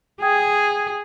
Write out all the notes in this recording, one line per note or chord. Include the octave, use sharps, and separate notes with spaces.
G#4 G5 D#6 G#6